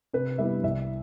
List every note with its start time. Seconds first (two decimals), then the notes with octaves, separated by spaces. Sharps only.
0.13 C3 B4
0.38 G3 B3 E4 E5
0.63 C2 E5